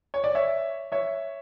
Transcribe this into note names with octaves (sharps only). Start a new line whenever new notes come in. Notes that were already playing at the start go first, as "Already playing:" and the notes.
C#5
D5
C#5 E5
C#5 E5